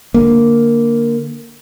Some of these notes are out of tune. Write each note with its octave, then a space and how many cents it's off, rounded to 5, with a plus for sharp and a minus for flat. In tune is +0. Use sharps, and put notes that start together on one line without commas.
D3 +0 A#3 +0